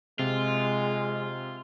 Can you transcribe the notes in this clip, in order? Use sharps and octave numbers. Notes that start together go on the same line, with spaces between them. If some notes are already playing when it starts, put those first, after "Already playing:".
C3 G#3 F4